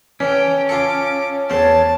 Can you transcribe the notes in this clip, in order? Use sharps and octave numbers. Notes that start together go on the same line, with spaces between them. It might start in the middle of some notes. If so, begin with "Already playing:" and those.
E3 C#4 A4 G5
F4 A4 D6
E2 A2 C5 C#5 A5